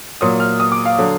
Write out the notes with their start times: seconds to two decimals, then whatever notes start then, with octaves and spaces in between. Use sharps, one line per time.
0.21 A#2 F#3 D#6
0.40 F6
0.60 D#6
0.72 D6
0.85 F5
0.98 D3 F#3